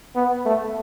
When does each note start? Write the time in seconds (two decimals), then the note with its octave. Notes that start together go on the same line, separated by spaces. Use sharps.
0.15 B3
0.45 A3